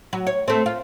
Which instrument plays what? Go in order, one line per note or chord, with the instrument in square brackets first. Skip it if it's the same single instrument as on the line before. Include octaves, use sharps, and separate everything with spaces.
[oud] F#3
C#5
A3 C4
F4